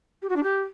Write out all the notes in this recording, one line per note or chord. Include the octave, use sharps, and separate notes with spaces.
G4
F#4
D4
G4